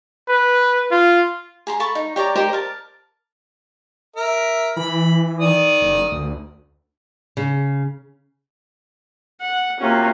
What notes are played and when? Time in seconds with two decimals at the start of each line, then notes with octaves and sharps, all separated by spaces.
0.28 B4
0.91 F4
1.67 G#4 A#5 C6
1.80 A4 A5 B5 C#6
1.95 D#4
2.16 G4 C#5 D5 A#5
2.36 D#4 G4 A#4 C5
2.53 A#4 A5
4.16 A#4 E5
4.76 E3 B5
5.40 D#3 D5 D#6
5.81 F#1
6.11 D2
7.37 C#3
9.41 F#5
9.80 C3 A#3 C#4 F4 F#4